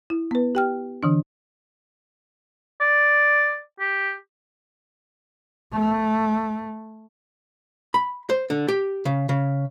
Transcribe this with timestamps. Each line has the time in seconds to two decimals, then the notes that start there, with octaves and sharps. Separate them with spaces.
0.10 E4
0.31 B3 B4
0.55 G4 G5 F6
1.03 D3 E3 D4
2.81 D5
3.80 G4
5.73 A3
7.94 B5
8.30 C5
8.50 D3
8.68 G4
9.05 C#3
9.29 C#3